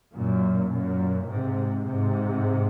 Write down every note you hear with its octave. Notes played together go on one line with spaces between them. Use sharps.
F#2 A#2
F#2 A#2
G#2 C3
G#2 C3